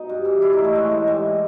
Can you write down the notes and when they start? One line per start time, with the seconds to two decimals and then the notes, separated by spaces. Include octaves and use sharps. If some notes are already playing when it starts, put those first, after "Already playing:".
Already playing: B2 D#4
0.09 G2
0.25 E3
0.42 A2 E4
0.53 D#4
0.58 E3
0.64 A3
0.75 A2 G#3
0.91 E3
1.07 G#2 G3